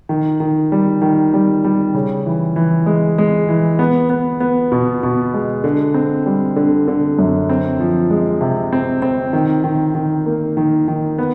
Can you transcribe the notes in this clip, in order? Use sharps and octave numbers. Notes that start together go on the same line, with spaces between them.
D#3
D#3
G3
D#3
G3
G3
C#3
E3
E3
G#3
G#3
E3
B3
B3
B3
B2
B2
G#3
D3
C4
G3
D3
D3
F#2
C4
F3
G#3
C3
C4
C4
D#3
D#3
D#3
A#3
D#3
D#3
B3